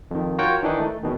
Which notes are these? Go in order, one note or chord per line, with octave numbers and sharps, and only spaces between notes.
F2 D#3
F4 F#4 A#4 C#5 F#5 G5
D#3 E3 D4 D#4
A3
E2 B2 D#3